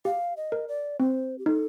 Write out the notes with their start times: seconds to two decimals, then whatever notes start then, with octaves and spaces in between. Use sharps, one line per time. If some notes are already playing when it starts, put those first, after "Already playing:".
0.05 G4 F5
0.37 D#5
0.52 A#4
0.68 D5
1.00 C4 C5
1.38 G4
1.46 D#4 A4